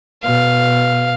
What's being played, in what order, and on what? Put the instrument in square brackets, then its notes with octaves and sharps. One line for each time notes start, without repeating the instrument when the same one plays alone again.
[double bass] B2 [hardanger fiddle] F5